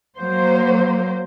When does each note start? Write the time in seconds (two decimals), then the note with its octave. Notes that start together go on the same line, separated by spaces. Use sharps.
0.18 F#3 A#3 C5